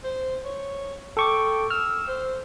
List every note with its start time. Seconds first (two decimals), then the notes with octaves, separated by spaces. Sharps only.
0.03 C5
0.45 C#5
1.17 A4 G5 C#6 D6
1.71 E6 F6
2.08 C5